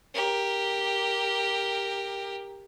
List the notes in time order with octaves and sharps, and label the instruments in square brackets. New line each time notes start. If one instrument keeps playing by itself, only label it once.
[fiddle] G4 A#4